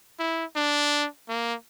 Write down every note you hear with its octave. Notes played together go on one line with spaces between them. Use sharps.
E4
D4
A#3